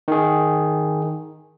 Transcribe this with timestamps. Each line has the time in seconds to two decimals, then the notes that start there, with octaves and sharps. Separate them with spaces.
0.08 D#3 G#4